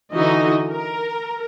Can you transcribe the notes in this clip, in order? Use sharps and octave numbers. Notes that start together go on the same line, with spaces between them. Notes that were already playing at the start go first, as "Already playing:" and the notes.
D3 E3 D#4 F#4 D#5
A#4